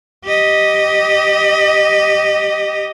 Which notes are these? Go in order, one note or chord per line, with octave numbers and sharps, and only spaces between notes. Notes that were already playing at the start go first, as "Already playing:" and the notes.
G4 D#5